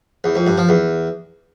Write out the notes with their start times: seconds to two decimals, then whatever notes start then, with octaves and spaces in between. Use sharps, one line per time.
0.24 E2
0.35 F2
0.47 G2
0.58 F3
0.69 E2